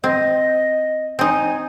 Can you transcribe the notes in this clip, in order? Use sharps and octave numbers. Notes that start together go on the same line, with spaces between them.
C4 D#5
C4 D#4 G#5